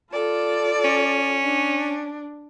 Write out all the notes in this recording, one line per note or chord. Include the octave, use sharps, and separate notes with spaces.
F4 A4 D5
C#4
D4